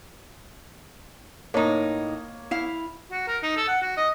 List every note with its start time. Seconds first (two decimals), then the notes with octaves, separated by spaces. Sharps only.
1.54 A2 A#3 D#4 C#5
2.51 E4 F5
3.12 F#4
3.27 A#4
3.43 D#4
3.57 A4
3.68 F#5
3.82 F#4
3.97 D#5